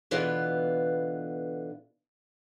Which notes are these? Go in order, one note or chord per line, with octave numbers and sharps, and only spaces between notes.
B2 D3 E3 B3 F4